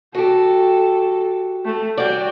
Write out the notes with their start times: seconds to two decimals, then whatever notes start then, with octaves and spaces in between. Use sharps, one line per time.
0.15 F#4 G4 A4
1.65 A3
1.97 G3 F#4 D5 G5